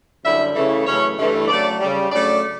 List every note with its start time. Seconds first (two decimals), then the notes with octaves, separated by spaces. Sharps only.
0.24 F#2 D3 G3 E4 E5
0.55 C#3 E3 A3
0.86 F#2 C#3 E3 A3 C#4 C#5
1.17 G2 E3 A3
1.48 C#3 F#3 A3 D4 D5
1.80 C#3 G3
2.11 F#2 C#3 F#3 A3 D4 D5